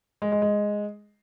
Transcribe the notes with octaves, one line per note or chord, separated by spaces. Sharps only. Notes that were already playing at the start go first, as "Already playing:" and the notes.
G#3
G#3
G#3